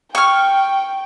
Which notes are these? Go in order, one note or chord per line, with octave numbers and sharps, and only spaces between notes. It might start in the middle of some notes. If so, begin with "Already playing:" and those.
G5 C#6 F6